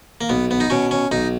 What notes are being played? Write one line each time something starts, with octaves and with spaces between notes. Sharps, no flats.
A#3
B1 B3
B3
D#4
B2 C#4
C#4
B1 D#4